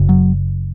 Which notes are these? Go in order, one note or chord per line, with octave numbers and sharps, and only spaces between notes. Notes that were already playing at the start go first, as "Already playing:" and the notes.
Already playing: F#1 F#2 C#3
F#3